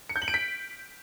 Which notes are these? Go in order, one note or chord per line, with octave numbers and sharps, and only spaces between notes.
C#7
G6
F#7
D7
B6